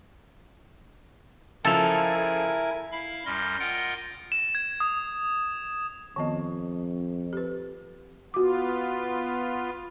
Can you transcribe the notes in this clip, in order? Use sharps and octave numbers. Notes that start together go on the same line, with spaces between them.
C#2 F3 E4 A4 A#4 G#5 F7
E4 F5 B5
F#2 G3 C6 F6 A#6
F4 A#4 D#5 F#5 G5
E7
G#6
D#6
F2 D#3 B3 D#5
G4 B4
B3 F4 F#4 D6